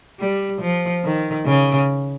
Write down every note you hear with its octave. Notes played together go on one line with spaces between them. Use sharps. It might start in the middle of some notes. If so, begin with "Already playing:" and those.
G3
F3
D#3
C#3